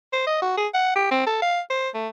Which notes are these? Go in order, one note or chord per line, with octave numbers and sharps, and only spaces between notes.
C5
D#5
F#4
G#4
F#5
G4
C4
A4
F5
C5
A3